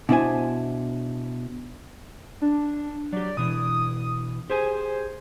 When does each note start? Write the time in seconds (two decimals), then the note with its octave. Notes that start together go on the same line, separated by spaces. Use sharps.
0.09 B2 D4 E4 C5 G#5
2.42 D4
3.13 F#3 G4 D5
3.37 B2 E3 D4 D#6
4.50 G4 G#4 C5 G#5